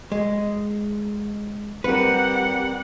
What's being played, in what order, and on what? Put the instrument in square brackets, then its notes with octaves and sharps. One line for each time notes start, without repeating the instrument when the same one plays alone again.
[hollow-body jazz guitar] G#3
[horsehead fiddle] G3 F#5 [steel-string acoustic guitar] C4 A#4 [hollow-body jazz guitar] B4